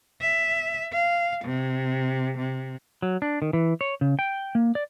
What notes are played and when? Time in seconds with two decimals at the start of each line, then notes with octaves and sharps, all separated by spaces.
0.21 E5
0.93 F5
1.45 C3
2.38 C3
3.02 F#3
3.22 D4
3.42 D#3
3.53 E3
3.81 C#5
4.01 C#3
4.19 G5
4.55 A#3
4.75 D5